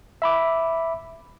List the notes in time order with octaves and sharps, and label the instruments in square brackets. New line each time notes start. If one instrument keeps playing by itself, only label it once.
[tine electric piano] E5 B5 D6